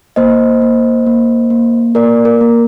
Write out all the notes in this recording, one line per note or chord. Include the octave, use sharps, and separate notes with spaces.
A#3 C5 D#5
A#3
A#3
A#3
A#3 A#4 D5
A#4
A#3